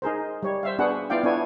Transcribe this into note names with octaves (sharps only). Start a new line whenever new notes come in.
D#4 G#4 A#4 C5
G3 C#5
C5 E5 F5
B3 D4 F#4 G#4 B4 F#5
B3 E4 F4 D5 F5 G5
B3 D4 E4 A4 C#5 G#5